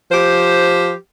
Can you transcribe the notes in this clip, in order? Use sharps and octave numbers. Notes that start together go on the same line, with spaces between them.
F3 G4 C5